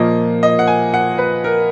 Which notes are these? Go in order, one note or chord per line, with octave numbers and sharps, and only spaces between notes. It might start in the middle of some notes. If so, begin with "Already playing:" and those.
Already playing: A#2 F3 A#3 D#5
D#5
F#5
G#5
F#5
B4
A#4